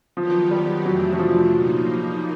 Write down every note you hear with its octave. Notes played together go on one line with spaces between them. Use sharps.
D#3 F3 F#3 B3 D#4 G4
G3
F2 C3 E3 F#3 A3 D4
F#3
F3
A#2 F3 A#3 D#4